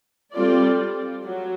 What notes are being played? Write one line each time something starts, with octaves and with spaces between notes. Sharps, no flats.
G3 C4 F4 A4 D5
F#3